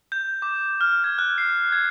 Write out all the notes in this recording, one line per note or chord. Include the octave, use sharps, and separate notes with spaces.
G6
D6
F6
G#6
F#6
C7
G#6